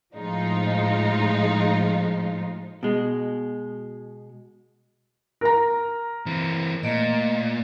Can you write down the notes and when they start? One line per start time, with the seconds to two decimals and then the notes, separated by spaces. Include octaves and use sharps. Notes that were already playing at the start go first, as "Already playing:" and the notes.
0.14 A2 F3 G#3 D#4 F4
2.83 B2 G#3
5.41 A#4 A#5
6.26 E3 C4
6.83 A#2 A3 A#3 D#5